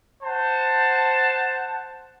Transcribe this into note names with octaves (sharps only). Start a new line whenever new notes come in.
C5 F#5 A5